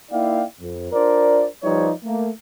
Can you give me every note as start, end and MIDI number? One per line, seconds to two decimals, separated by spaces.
0.11 0.43 58
0.11 0.43 63
0.11 0.43 64
0.11 0.43 74
0.11 0.43 77
0.11 0.43 79
0.60 0.90 41
0.92 1.46 62
0.92 1.46 65
0.92 1.46 70
0.92 1.46 72
0.92 1.46 74
1.63 1.90 53
1.63 1.90 55
1.63 1.90 63
1.63 1.90 71
1.63 1.90 73
1.63 1.90 74
2.04 2.29 57
2.04 2.29 58